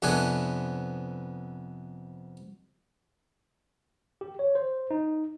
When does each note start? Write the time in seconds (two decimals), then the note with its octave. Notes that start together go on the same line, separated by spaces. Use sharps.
0.02 F2 C3 B3 D4 B4 G#5
4.21 G4
4.39 C#5
4.55 C5
4.91 D#4